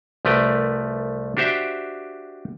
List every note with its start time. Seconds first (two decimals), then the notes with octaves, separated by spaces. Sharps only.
0.25 C2 F3 A3 B4 G5 A#5
1.37 D4 F#4 G4 C5 E5 G5